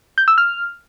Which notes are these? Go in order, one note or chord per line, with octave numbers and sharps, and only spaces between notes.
G6
E6
F6